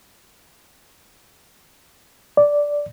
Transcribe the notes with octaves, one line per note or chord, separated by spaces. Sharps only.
D5